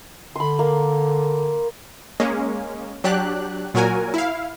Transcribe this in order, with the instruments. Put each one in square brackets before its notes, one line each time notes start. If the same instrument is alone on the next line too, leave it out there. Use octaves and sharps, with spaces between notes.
[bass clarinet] D3 [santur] B5 C6
[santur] A#3
[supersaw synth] G#3 A#3 C#4
F#3 D4 G4 F#6
A#2 F#3 F#4 A#4 G#5
E4 F5